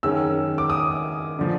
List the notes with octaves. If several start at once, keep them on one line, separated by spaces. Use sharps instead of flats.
F#2 D#3 G#3 C#4 E6
D6
D#6
D3 F3